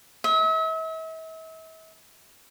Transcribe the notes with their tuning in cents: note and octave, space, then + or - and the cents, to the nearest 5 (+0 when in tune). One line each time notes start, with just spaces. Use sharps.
E5 -40